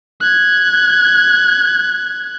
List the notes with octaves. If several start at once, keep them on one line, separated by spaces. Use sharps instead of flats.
F#6 G#6